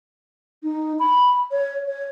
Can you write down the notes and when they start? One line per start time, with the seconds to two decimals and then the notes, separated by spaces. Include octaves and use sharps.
0.63 D#4
0.99 B5
1.51 C#5
1.85 C#5